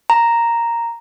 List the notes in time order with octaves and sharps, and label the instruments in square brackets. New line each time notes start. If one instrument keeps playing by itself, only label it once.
[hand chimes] A#5